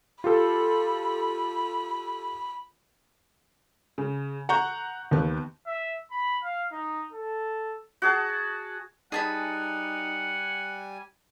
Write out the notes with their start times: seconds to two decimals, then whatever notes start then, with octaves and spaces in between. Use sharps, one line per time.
0.24 F4 G4 A4 B5
3.98 C#3
4.49 F#5 A#5 C#6 G6
5.11 D#2 B3
5.67 E5
6.11 B5
6.43 F5
6.72 D#4
7.13 A4
8.02 F#4 G#4 A5
9.12 G3 D#4 G#4 F#5 G#5 A5 B5